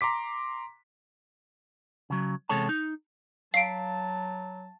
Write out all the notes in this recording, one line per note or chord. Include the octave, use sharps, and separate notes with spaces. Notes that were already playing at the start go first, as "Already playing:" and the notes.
A#5 C6 D6 B6
C#3 F#3
E2 C3 G#3 A4 C#5 A5
D#4
F#3 F5 A5 C7 D7